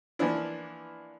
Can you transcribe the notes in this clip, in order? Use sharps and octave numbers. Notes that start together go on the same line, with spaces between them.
E3 F3 A#3 B3 D4 E4